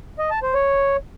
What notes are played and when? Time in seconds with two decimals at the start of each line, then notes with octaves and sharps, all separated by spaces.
0.19 D#5
0.30 A5
0.42 C5
0.54 C#5